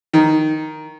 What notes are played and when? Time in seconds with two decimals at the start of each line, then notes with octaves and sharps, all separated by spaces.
0.13 D#3